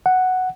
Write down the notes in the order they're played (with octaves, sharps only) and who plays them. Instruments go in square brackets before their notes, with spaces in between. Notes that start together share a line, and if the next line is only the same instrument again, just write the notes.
[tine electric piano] F#5